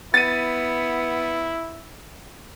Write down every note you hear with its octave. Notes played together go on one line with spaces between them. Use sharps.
B3 E4 A6 D#7